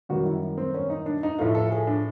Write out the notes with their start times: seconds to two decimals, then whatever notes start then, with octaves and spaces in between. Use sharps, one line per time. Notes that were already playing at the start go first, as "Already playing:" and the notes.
0.09 F#2 D#3 G3 F#4
0.25 E4
0.58 C4
0.74 C#4
0.90 D#4
1.06 D4
1.23 D#4
1.39 A2 F3 A3 F4
1.55 A4
1.71 G#4
1.87 D4